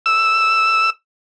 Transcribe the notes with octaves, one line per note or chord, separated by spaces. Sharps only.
E6